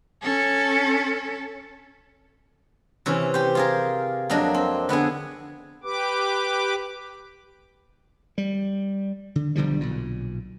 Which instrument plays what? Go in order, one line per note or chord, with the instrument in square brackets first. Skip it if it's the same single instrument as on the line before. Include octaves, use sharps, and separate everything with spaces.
[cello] C#4 A4
[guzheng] C3 E3 C#4
G4 C5
F4 G#4 A#4
F2 F#3 A#3 D4 D#5
C4
D3 B3 D4 G#4
[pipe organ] G4 B4 D6
[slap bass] G3
D3
B1 D3 F3 G3
B1 A#2